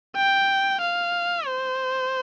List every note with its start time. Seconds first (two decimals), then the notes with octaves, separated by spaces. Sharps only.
0.16 G5
0.81 F5
1.46 C5